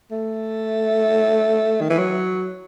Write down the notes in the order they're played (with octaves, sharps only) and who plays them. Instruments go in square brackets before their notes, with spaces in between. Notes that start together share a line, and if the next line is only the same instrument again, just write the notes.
[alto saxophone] A3
D#3
E3
F#3